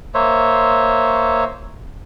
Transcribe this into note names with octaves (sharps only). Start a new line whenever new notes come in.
A#3 C5 C#5 E5